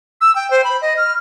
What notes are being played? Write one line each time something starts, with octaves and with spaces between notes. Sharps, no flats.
E6
G5
C5
B5
D#5
F6